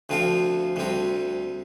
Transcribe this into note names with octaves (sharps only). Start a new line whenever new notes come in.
D2 D3 F3 C4 F4
D2 D3 G3 C4